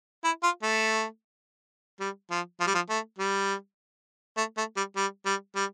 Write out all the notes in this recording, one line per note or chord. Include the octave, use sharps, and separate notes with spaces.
E4
F4
A3
G3
F3
F3
G3
F3
A3
G3
A3
A3
G3
G3
G3
G3